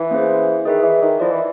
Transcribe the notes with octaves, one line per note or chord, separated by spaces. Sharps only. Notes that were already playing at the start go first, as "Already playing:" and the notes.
Already playing: E3
A#3 C#4 E4 G#4 C5
D#3 G#4 B4 E5
E3
D#3
F3 E4 A4 D5
E3